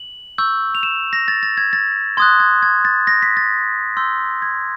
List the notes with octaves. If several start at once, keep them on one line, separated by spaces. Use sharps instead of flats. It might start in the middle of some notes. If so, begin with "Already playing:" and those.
Already playing: F#7
C#6 E6 G6
F7
E7
A#6
A6
A6
G#6
A6
C6 D#6 F#6 G#6
G#6
G#6
A6
A#6
B6
A6
C6 E6 G6
G#6